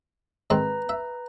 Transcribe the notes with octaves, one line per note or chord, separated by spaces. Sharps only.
G#2 D#3 C4 B4 A#5
E5